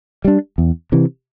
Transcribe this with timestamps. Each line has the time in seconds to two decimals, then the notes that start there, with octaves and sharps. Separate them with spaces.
0.25 G3 D4
0.58 E2
0.92 C3 E3